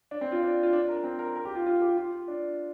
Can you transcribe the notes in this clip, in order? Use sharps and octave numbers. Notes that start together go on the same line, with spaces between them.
D4
C4
F4
D4
F4
D4
A#4
C4
A#4
A#4
G4
F4
F4
G4
F4
D4